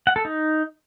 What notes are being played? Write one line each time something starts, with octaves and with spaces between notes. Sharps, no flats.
F#5
A4
D#4